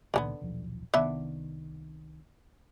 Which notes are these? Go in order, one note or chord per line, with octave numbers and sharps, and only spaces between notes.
C#2 A#2 D3 D#3 G#3 B3
D#1 B1 F3
C2 C3 D#3 B3 D4 E5